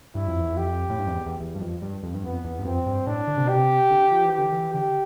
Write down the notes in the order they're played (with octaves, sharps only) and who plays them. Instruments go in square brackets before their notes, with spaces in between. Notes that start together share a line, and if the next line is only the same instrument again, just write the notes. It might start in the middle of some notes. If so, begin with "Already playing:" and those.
[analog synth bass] G2 [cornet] E4
[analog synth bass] F2
E2
F2
[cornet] G4
[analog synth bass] A2
G2
F2
E2
E2
E2
G2
F2
G2
F2
G2
[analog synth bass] F2 [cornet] B3
[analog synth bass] E2
G2
[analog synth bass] F2 [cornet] C4
[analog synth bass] G2
[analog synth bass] A2 [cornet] D4
[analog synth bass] D3
C3
[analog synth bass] B2 [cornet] G4
[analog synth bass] C3
D3
F3
E3
[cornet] G4
[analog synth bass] D3
E3
[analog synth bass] D3 [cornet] G4